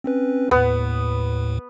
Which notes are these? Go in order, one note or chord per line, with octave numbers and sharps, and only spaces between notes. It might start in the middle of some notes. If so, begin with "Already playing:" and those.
C4 C#4 B4
D#2 A2 B3